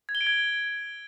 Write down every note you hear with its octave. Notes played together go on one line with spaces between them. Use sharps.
G#6
G7
D7
G#6